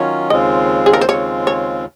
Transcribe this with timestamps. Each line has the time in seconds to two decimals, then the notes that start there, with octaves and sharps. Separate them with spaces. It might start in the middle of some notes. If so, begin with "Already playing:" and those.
Already playing: D#3 F#3 C#4 F4 C#5
0.30 D#2 C#3 G#3 C4 F4 D#5
0.86 G#4
0.93 A#4
1.01 C5
1.08 D#2 C#3 G#3 C4 F4 C#5
1.47 C#5